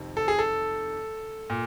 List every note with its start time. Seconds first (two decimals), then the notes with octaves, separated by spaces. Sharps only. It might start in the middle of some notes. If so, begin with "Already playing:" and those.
Already playing: F2 C3 D#3
0.17 A4
0.28 G#4
0.39 A4
1.50 A#2